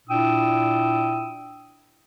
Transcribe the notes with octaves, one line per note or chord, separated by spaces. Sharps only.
A#2 D4 E4 G5 D#6 E6